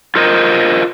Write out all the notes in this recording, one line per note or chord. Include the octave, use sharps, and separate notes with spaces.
F4 A#4 C5 D#5